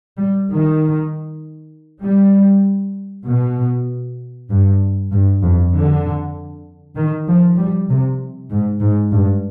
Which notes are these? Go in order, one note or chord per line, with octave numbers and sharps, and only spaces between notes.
G3
D#3
G3
B2
G2
G2
F2
D3
D#3
F3
G3
C3
G#2
G#2
G2